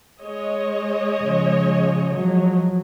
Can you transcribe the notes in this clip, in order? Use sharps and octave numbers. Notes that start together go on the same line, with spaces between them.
G#3 C#5 D#5
C#3 F3
F3 F#3